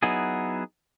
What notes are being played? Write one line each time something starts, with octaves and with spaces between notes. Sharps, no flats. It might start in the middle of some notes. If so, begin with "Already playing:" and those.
F#3 B3 D#4 E4 G#4